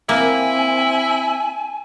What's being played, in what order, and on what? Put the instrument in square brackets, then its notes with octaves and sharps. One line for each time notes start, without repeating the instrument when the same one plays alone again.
[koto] A#3 [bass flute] C4 [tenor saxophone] E4 [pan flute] G#5